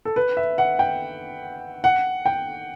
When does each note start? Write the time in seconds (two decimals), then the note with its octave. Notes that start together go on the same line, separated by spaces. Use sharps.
0.05 A4
0.16 B4
0.37 E5
0.58 F#5
0.79 G5
1.84 F#5
2.26 G5